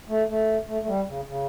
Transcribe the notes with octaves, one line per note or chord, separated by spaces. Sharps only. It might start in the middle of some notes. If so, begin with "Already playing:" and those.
A3
A3
A3
A3
G3
C#3
C#3